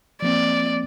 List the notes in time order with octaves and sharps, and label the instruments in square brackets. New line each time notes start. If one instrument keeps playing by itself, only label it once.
[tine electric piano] F3 A#3 C4 [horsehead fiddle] D5